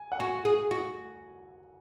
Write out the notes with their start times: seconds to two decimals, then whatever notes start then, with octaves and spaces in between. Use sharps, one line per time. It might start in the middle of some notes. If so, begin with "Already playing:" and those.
Already playing: G#5
0.12 F#5
0.19 F#4 G#5
0.45 G#4
0.71 F#4